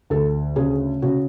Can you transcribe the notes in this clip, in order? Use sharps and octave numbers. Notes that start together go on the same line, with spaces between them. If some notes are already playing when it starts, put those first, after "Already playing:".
D2 A4
C#3 G#4
C#3 F#4